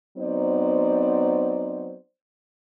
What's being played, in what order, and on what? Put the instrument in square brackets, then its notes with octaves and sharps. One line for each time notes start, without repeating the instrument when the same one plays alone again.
[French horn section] F#3 B3 C4 D#4 C5 D5